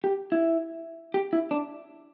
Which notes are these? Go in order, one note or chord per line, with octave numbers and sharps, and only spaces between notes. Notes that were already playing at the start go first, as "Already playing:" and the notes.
G4
E4
G4
E4
D4